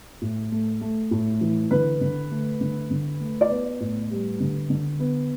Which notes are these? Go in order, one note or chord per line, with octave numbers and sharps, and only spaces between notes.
A2
A3
A3
A2
E3
D3 B4
D3
A3
D3
D3
A3
D5
B3 B4
A2
G3
D3
D3
B3